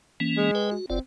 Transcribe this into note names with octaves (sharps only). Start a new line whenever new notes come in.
E3 A#3 C#4
G#3
B4 G5 G#5
F#4
F#1 C4 F4 D5